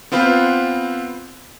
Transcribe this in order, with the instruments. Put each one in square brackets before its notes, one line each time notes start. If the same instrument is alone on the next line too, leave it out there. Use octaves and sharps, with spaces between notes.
[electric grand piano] B3 C4 F4 B4 C5